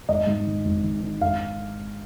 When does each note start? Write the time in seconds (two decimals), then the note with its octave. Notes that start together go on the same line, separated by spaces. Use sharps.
0.08 G#1 D#5
0.27 G#2
0.47 D#3
0.65 G#1
0.84 D#3
1.03 D#3
1.21 G#1 F5